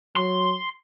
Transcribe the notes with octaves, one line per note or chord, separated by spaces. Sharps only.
F#3 C6